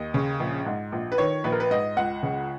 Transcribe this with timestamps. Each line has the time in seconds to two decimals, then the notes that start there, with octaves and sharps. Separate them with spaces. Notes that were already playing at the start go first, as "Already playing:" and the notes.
Already playing: D#2 D#5
0.14 C#3
0.40 A#1
0.66 G#2
0.92 A#1
1.12 B4
1.18 D#3 C#5
1.44 A#1 B4
1.52 A#4
1.60 B4
1.71 G#2 D#5
1.97 C#2 F#5
2.23 C#3